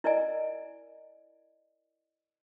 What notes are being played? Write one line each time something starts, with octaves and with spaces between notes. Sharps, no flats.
E4 A#4 D5 D#5 G#5